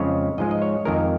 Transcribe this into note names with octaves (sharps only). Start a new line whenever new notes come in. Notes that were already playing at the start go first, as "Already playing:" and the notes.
Already playing: F2 C#3 F3 G#3 C#5
G#2 F3 G#3 D#5
D#5
C#5
F2 D#3 G#3 A#4